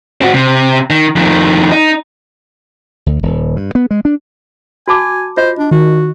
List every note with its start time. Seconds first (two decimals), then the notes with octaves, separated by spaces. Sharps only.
0.21 C4 F#4
0.34 C3
0.90 D#3
1.16 F2 D#3
1.72 D#4
3.06 D2
3.23 D#1
3.56 G2
3.75 B3
3.91 G#3
4.05 D4
4.88 F#4 G#5 A5 D6
5.37 F4 C5 D#5
5.59 D4
5.71 D#3 F#4